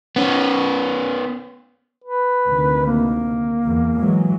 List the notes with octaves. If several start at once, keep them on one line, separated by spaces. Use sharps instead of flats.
B3 C#4
B4
D2 C3 D#3
A#3
E2
E3 F#3 G#3